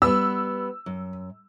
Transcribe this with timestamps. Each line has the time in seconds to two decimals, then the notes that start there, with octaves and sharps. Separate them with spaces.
0.02 G3 B3 B4 E6
0.86 F#2